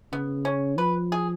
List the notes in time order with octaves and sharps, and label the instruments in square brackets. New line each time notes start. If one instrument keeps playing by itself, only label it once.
[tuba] C#3 [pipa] B3
[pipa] C#4
[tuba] F3 [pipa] B4
[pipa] G#4